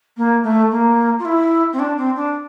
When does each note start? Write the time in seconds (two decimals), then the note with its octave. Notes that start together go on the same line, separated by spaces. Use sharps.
0.17 A#3
0.43 A3
0.71 A#3
1.19 F4
1.25 E4
1.72 C4
1.79 D4
1.97 C4
2.16 D4